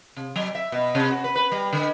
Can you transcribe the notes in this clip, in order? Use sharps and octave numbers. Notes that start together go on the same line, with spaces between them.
C3
F#3
E5
B2
C3
F#4
B4
B4
G3
D3